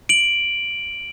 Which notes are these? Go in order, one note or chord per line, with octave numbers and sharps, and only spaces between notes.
D7 F#7